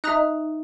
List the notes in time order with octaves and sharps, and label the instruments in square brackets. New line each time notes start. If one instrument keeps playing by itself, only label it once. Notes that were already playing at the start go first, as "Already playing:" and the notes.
[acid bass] D#4 [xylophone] E5 A#5 D#6 F#6